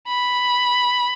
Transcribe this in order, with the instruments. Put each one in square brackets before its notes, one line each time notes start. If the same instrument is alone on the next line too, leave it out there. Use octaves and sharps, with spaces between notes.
[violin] B5